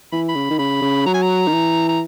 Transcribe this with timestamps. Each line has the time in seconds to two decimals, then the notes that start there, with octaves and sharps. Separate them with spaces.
0.12 E3 B5
0.29 B5
0.35 C#3
0.50 D#3
0.59 C#3 B5
0.82 C#3
1.06 F#3 A#5
1.14 G#5
1.22 A#5
1.48 D#3
1.53 E3
1.89 A#5